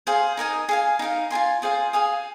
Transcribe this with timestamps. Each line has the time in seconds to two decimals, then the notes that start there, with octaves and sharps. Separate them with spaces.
0.07 G#4 C5 F5
0.37 D#4 A#4 D#5 G#5
0.69 G#4 F5 G#5
0.99 D#4 A#4 F5
1.30 F4 A#4 G#5 C6
1.62 F4 G#4 C5 F5
1.93 G#4 F5 G#5 D#6